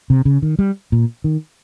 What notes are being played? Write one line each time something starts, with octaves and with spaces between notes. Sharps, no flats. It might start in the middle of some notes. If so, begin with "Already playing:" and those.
C3
C#3
D#3
G3
A#2
D#3